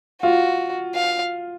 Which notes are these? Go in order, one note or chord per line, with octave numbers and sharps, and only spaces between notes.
F4 F#4
F5